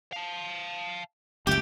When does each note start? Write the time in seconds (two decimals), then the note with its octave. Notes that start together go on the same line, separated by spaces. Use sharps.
0.13 F5 A5
1.47 F#1 C#2 G3 A3 G4 G5